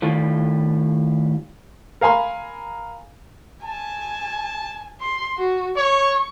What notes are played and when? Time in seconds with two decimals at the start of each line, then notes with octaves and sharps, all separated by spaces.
0.02 A2 D#3 G3 F4
2.01 A#4 F5 G#5 B5 C6
3.64 G#5 A5
5.00 C6
5.37 F#4
5.77 C#5 C#6